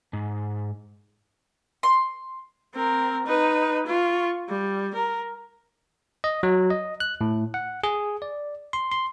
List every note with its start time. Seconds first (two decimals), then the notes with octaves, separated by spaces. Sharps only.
0.13 G#2
1.83 C6
2.74 C4 A#4
3.27 D#4 B4
3.86 F4 C#6
4.49 G3
4.95 A#4
6.24 D#5
6.43 F#3
6.70 D#5
7.00 F#6
7.21 A2
7.54 F#5
7.84 G#4
8.22 D5
8.73 C6
8.92 C6